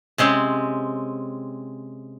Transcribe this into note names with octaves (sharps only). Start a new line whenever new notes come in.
C3 G#3 C4 C#4